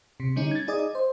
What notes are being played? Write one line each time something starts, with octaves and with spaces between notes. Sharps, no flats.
C3
D3 G3 C#4 D#4
G#6 A6
D#4 G#4 D5 D#5
D#5
C5